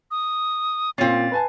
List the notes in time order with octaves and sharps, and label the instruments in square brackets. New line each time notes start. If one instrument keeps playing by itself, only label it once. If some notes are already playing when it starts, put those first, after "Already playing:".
[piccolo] D#6
[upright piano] A#2 F4 C7 [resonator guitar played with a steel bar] C4 C#4 [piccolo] A6
[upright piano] B4 G#5 A5